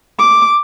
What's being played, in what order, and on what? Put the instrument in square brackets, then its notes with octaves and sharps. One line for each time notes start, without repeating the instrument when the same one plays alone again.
[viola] D6